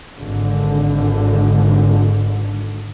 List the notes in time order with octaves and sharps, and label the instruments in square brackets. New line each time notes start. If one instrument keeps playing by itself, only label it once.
[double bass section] G#1 D3